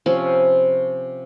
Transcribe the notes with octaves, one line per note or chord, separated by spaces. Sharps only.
C3 F3 C#4 B5